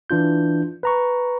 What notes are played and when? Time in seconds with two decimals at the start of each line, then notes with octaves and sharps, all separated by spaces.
0.10 E3 D4 F4 G6
0.83 B4 A#5 C#6